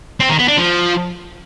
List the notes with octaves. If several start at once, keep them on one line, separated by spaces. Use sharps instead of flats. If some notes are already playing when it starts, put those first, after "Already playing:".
C4
D#3
B3
D4
F3